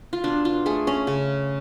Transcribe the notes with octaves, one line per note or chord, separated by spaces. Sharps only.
F4
B2 D4
F4
A3 G#4
C#4
C#3